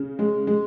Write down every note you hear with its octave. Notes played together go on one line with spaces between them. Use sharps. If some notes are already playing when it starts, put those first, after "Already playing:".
Already playing: C#3
G#3
G#3